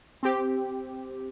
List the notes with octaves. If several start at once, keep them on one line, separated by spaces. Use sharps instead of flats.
C4 G4